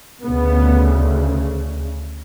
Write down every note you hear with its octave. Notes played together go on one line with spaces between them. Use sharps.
D2 C#3 B3